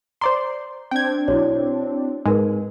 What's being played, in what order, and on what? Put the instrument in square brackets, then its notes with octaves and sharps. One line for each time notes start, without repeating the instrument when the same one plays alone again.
[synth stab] C5 D5 C6 [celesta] A#5
[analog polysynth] C4 D4 [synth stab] G5 G#6
[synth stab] B1 [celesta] E4 F#4 C#5
[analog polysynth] G#2 [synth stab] G#3 [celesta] D#4 A#4 B4